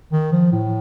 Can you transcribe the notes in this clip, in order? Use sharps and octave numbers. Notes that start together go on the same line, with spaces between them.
D#3
F3
A2